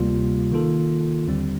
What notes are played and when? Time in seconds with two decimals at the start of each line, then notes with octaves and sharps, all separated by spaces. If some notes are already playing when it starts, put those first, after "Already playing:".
Already playing: D2 C3 G3 A#3 F4
0.52 D#3 A#3 F4 A4
1.27 D#2 D3 G3 C4